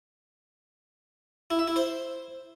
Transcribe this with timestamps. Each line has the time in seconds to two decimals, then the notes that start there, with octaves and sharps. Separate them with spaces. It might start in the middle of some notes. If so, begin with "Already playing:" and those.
1.50 E4
1.59 E5
1.68 E4
1.76 C5